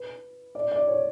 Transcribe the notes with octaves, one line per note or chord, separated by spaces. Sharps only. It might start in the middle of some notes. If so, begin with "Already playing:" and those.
Already playing: B4
D5
D5
C#5